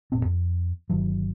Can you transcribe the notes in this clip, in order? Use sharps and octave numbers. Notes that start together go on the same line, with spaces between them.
F1 A#2 B3 C4
F2
G1 D#3 F#3